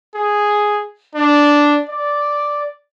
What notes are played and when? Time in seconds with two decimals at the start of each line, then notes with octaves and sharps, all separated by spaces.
0.14 G#4
1.15 D4
1.89 D5